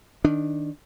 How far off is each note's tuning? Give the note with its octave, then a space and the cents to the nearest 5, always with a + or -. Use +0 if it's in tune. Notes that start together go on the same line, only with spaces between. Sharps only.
D#3 +0 D4 +0